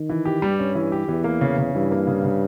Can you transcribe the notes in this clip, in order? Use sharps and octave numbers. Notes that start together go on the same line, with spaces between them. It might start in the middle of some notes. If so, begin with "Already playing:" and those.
Already playing: D#3
E3
G4
G2 G3
C#4
E3
G4
E2 E3
A#3
C#3
C#3
G2 E3
A#3
C#3
C#3